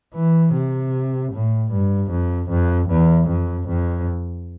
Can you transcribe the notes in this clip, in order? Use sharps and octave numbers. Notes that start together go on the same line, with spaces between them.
E3
C3
A2
G2
F2
F2
E2
F2
F2